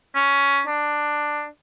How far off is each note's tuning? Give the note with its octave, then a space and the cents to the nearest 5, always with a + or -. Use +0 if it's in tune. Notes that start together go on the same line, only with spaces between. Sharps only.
C#4 +10
D4 +10